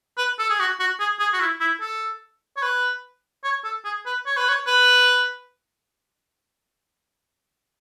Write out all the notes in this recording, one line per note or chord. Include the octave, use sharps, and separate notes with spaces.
B4
A4
G#4
F#4
F#4
G#4
G#4
F#4
E4
E4
A4
C#5
B4
C#5
A4
G#4
B4
C#5
B4
C#5
B4